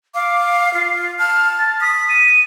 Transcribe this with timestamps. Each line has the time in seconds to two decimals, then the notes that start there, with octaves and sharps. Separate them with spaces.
0.14 F5 D6
0.74 F4 C7
1.19 A5 F6
1.59 A6
1.81 D#6 B6
2.09 D#7